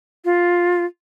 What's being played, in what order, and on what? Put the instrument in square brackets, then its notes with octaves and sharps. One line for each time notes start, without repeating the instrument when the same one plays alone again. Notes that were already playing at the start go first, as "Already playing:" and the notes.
[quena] F4